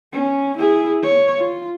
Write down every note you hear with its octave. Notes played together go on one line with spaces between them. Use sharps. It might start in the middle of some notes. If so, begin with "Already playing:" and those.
C#4
E4 G#4
C#5
F4